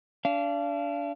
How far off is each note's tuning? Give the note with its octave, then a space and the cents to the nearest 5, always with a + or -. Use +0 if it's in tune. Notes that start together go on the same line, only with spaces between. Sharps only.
D4 -25 F5 -30